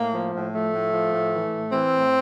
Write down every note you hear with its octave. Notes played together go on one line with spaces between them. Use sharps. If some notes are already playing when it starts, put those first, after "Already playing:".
Already playing: A2 A#3
F3
A2
F3 A3
A2
F3
A2
E3
A2
E3 C4
A2